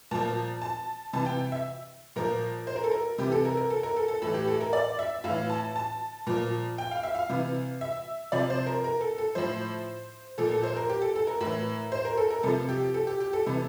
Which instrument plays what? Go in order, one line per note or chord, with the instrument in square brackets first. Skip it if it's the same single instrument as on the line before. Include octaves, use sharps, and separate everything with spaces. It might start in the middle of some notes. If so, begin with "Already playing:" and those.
[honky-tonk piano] A#2 F3 A5
A5
C3 E3 A5
G5
E5
A#2 F3 A#4
C5
A#4
A4
A#4
C3 E3 G4
A4
A#4
A#4
A4
A#4
A4
A4
A2 E3 A4
G4
A4
A#4
D5
E5
A2 E3 F5
A5
A5
A#2 F3
G5
F5
E5
F5
C3 E3
E5
C3 F3 D5
C5
A#4
A#4
A4
A4
A2 F3 C5
A#2 F3 A4
A4
C5
A#4
G4
A4
A4
A#4
A2 E3
C5
A#4
A4
A#4
C3 F3 A4
G4
A4
G4
G4
A4
C3 E3